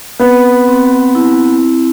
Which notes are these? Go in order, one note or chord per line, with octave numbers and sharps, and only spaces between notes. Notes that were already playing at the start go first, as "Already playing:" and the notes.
B3 C4 B4
C4
E4